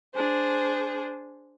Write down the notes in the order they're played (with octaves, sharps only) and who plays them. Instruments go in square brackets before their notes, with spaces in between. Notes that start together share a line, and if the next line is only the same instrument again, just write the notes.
[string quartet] D4 G#4 C5